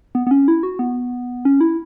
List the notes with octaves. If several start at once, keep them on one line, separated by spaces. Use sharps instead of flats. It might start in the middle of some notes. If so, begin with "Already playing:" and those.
B3
B3
C#4
E4
F#4
B3
C#4
E4